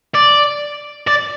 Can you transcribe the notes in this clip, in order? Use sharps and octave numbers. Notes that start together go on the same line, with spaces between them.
D5
D5